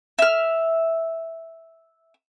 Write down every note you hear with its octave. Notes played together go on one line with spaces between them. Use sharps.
E5 F6